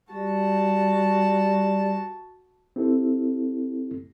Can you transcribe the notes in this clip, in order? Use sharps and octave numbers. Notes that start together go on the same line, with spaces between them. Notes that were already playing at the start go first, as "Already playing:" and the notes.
G3 F#4 A5
C4 E4 G4 A4